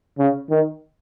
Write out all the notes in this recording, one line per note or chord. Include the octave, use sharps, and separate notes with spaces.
C#3
D#3